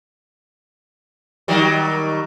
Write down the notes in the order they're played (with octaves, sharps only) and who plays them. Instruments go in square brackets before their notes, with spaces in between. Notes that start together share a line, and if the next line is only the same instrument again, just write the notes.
[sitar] D#3 F#3 G3